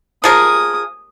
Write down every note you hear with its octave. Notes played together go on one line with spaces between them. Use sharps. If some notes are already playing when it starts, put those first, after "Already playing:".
F3 G#4 A#4 D#6